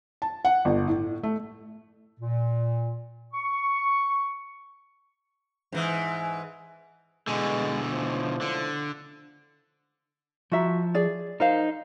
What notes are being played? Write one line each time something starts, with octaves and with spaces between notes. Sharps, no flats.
A5
F#5
G1
A2
A3
A#2
C#6
G#2 E3
B2 D3 E3 G#3
C#2 A2 F3
D3
F3 F#4 E5 A#5
G#4 D5
D#4 A#4 C5 F5